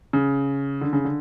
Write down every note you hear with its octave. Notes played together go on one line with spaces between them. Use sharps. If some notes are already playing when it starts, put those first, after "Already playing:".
C#3
D3
C#3
D3